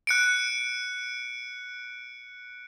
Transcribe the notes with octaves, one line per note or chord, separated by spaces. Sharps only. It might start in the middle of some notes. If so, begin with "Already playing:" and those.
F#6 C#7 D7